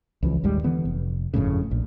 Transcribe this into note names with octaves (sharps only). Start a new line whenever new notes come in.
C#2 E3 F3
A1 D#2 G3 G#3
D3 E3 B3
F1
G1 F2 A2 C#3
A#1